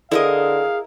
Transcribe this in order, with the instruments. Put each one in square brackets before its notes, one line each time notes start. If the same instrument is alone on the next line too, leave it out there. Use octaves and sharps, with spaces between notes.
[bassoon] D3 [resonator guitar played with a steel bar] E4 A#4 D#5 [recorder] G#4 [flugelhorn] F5